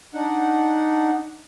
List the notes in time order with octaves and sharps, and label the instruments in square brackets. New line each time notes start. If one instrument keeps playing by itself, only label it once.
[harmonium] D4 D#4 F#5